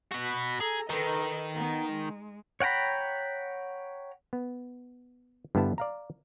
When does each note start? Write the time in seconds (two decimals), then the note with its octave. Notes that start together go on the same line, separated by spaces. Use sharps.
0.11 F#4 B4
0.60 G#4 A4 A#5
0.90 D#3 A4 B4 D#5
1.54 B3 D#4
1.91 G#3
2.60 C#5 F#5 G5 A#5 B5
4.33 B3
5.55 G2 D3 B3 E4 A5
5.78 D5 F5 A#5